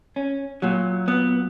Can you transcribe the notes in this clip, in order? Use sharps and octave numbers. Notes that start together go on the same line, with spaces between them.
C#4
A#2 F#3
B3